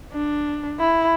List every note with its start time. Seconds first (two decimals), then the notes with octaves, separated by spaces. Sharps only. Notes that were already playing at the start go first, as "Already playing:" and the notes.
0.13 D4
0.80 E4